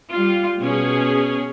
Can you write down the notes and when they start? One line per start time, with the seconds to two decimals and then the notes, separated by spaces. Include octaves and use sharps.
0.11 G3 F4
0.59 B2 C#4 G#4